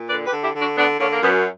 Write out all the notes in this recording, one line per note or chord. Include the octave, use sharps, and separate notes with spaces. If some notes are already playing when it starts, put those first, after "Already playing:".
Already playing: A#2
D3 B4 D5
G4 B4
D3
E4 G4
D3
D4 F#4
D3 B3 D4
D3 A#3 C#4
A#3
F#2 B3